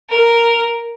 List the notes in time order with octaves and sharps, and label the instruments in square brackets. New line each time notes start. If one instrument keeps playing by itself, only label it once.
[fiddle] A#4